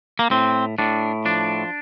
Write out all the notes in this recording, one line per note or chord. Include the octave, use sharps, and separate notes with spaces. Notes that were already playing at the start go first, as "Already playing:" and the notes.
A#3
A2 C4
A2 D4
F3 D4